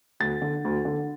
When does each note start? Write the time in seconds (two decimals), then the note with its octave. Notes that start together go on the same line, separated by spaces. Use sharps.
0.20 D2 A6
0.42 D3
0.65 D2
0.85 D3